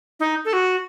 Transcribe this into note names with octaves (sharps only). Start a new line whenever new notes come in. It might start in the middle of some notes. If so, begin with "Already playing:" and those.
D#4
A4
F#4